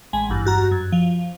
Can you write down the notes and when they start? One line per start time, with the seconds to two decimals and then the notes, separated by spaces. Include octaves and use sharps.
0.13 A1 G#3 G#5
0.30 G#1 E2 G2
0.45 G2 F#4 A#5
0.72 F#2
0.92 F3